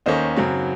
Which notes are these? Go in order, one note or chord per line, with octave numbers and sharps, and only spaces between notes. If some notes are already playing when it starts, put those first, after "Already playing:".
D#2 D#3 A#3 C#4 C5 D#5
F#2 C#3 F#3 C4